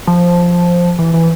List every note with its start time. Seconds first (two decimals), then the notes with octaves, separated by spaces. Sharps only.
0.07 F3
0.99 E3
1.14 E3